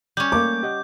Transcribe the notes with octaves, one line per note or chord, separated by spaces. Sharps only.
G3 C#4 G6
A3 A#3 D6
G4 D#5 F#5